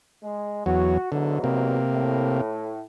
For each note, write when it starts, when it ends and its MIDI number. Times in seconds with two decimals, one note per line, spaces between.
0.24 0.66 56
0.66 0.98 40
0.66 0.98 54
0.66 1.11 66
1.12 1.77 40
1.12 1.77 44
1.12 1.39 50
1.12 1.77 54
1.44 2.41 48
1.44 2.41 58
1.92 2.81 45